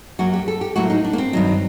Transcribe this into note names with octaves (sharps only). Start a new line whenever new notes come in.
F#2 F#3 A#3 F#4
G4
A4
G4
A2 F#3 A#3 F#4
D#4
D4
A#3
C4
G2 D#3 F#3